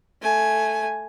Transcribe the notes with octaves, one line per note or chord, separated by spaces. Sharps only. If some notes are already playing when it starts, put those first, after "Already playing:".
A3 G#5